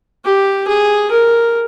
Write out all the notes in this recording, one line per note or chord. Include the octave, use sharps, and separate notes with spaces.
G4
G#4
A#4